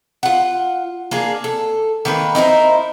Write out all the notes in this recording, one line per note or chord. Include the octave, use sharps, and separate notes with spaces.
F4 F#5
A#3 D4 G#4
A4
D#3 A#3 B4
D#4 E4 A#4 C5